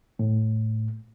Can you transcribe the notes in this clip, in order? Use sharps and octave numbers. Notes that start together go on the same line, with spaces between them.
A2